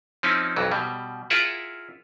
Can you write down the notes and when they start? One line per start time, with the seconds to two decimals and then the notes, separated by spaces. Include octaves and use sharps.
0.23 F3 C4 C#4 D#4 E4
0.56 B1 F2 E3 F#3
0.71 B2 G3
1.30 E4 F4 G#4 A#4 E5 F#5